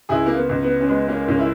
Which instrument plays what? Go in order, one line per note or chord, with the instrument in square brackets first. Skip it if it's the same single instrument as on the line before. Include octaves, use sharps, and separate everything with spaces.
[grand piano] C#2 [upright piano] E4 G#4
[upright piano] A#3
B3
[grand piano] C#2
[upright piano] B3
C#4
[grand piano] G#3 [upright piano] B3
[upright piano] A#3 C#4
[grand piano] C#2 [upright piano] A#3 C#4
[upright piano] E4